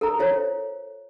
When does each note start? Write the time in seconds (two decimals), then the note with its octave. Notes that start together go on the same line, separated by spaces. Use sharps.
0.01 A4 A#4 A#5
0.19 F4 C5 C#5